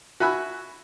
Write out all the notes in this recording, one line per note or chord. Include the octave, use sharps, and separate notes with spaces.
F#4 E5 G#5 B5 F#6